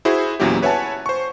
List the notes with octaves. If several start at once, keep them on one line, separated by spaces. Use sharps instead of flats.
E4 F#4 G#4 C5
E2 A#2 F#3 C#4 E4 G4
B4 C#5 E5 F#5 G#5 A5
C5 C#6